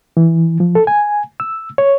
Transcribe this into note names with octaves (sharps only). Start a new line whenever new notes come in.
E3
F3
A4
G#5
E6
C#5